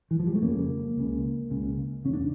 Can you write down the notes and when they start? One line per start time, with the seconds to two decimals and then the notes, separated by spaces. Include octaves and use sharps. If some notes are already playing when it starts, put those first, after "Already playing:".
0.11 E3
0.19 F3
0.27 G3
0.35 A3
0.42 F2 C#3 A#3
0.97 C#2 C#3
1.50 C#2 C#3
2.05 E2 C#3 C#4
2.13 D4